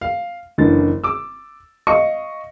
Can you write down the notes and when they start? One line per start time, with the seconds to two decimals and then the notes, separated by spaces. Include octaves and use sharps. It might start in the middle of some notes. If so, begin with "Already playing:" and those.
0.01 F5
0.58 F#1 D3 E3 C#4 A6
1.04 D6 E6
1.87 D#5 F5 C#6 C#7